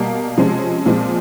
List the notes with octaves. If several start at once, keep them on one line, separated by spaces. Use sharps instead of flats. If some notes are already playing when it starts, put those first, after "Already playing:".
Already playing: B2 G3 A#3
C3 F3 G#3 C#4
A#2 F3 G#3 C4